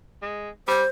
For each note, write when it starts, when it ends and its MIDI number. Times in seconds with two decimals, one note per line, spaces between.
0.22 0.50 56
0.68 0.83 55
0.68 0.89 72